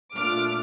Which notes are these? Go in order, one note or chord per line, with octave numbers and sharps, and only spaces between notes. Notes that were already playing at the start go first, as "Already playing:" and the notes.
A#2 A3 D4 F4 D6 F6